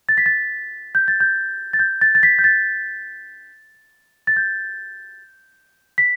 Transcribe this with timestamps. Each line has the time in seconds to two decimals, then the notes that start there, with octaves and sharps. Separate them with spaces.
0.09 A6
0.18 B6
0.26 A6
0.95 G6
1.08 A6
1.20 G6
1.73 A6
1.79 G6
2.01 A6
2.15 A6
2.23 B6
2.39 G6
2.44 A6
4.27 A6
4.37 G6
5.98 B6